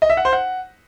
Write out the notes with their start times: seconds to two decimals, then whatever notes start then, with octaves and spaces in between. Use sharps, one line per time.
0.02 D#5
0.10 E5
0.17 F#5
0.25 C5
0.33 F#5